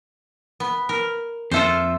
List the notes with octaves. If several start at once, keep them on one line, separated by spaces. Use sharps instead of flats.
B3
A#4
F2 F4 A4 C5 E5